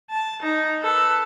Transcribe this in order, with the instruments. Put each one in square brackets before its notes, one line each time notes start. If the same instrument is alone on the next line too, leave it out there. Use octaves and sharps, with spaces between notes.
[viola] A5
D#4
A4 B4